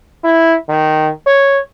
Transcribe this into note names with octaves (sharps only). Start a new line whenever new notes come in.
E4
D#3
C#5